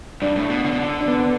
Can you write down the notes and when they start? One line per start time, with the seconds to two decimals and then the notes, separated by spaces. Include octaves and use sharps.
0.22 G2 D4
0.36 A2
0.50 B2
0.64 D3
0.72 B2
0.80 D3
1.01 D4
1.08 B3